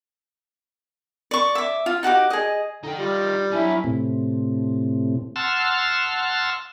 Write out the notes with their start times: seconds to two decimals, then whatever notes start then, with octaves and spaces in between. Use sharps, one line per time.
1.31 D5 C#6
1.55 E5 D6
1.86 F4
2.03 D#4 F#4 G4 D6
2.30 G#4 D#5
2.83 D3 D#4 G5
2.99 G3 F4
3.52 F#3 D4 E4 G#5
3.84 A2 C3
5.36 F#5 A5 C6 E6 F6